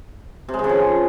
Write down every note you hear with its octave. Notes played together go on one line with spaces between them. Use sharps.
C3
G#3
D#3
C#3
F3